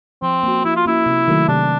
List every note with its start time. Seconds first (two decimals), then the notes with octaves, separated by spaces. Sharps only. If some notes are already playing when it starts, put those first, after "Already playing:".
0.22 F3 C4
0.43 A#3 C#4 F#4
0.64 F3 E4
0.76 F4
0.86 A#3 C#4 E4 F#4
1.06 C3
1.28 D#3 F#3 A3
1.48 C3 D4